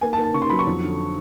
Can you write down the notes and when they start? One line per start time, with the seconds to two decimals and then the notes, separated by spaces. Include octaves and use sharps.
0.01 A#3 G#5
0.13 A5
0.18 A#3
0.24 A5
0.34 C#3 C#6
0.42 C6
0.50 F#3 B5
0.59 C#6
0.67 F2
0.83 D3